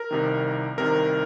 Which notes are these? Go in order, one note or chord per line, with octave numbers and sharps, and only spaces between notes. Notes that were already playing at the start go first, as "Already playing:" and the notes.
Already playing: A#4
C2 C3 D#3
C2 C3 D#3 A#4